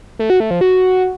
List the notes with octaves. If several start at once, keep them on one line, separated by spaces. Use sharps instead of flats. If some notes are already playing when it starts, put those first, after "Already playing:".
A3
F#4
A3
F3
F#4